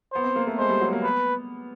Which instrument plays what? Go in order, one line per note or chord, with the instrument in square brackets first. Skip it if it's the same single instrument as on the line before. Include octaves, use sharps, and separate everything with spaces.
[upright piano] B3 [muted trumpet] C5
[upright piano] C4
A#3
A3
[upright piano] G#3 [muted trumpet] C5
[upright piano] G3
F#3
A#3
[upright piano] B3 [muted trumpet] B4